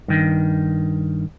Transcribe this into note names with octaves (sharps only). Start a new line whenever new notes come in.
G2 D#3